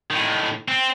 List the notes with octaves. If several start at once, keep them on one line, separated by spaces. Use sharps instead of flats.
A2 D#3
C4